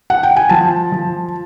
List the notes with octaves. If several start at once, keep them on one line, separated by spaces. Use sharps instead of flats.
F#5
G5
G#5
F3 A5
F3